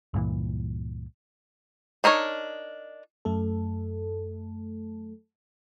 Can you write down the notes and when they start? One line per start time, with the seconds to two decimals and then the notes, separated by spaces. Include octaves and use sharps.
0.14 C#2 G2 A#2 E3
2.04 D4 D#4 A#4 C#5
3.25 F#2 A3 A4